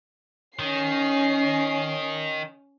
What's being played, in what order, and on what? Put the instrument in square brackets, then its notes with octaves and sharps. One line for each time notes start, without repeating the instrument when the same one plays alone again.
[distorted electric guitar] D#3 [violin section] C#4 C7